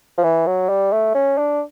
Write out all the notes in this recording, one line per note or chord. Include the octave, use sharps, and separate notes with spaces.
F3
E3
F#3
G3
A3
C#4
D4